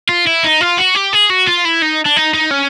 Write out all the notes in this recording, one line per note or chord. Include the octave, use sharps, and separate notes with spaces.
F4
E4
D#4
F4
F#4
G4
G#4
F#4
F4
E4
D#4
D4
D#4
D#4
C#4